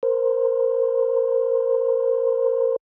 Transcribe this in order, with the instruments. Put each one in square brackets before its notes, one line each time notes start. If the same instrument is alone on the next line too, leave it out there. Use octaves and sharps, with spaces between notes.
[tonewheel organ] A#4 C5